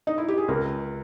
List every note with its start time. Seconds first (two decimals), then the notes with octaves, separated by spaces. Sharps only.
0.07 D#4
0.18 E4
0.28 G4
0.38 G#4
0.48 C#2 A#4